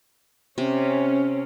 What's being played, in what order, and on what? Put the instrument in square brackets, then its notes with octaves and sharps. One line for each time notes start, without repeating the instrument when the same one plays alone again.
[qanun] C3 [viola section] C#4